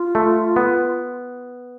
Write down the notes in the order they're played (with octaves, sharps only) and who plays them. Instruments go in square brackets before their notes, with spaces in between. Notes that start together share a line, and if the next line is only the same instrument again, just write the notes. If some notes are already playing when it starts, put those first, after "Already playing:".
Already playing: [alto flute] F4
[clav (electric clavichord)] A3
B3